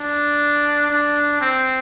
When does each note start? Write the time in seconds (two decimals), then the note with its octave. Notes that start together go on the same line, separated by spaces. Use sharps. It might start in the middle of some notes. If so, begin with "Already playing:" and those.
Already playing: D4
0.90 D4
1.41 C4